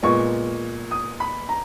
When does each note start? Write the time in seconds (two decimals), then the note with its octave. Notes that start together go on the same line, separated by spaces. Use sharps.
0.03 A#2 G#3 B3 C#6
0.91 D#6
1.20 B5
1.49 A#5